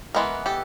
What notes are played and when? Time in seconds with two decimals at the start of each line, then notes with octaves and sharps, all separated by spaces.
0.15 E3 G#3 B3 A#4
0.46 G4 A4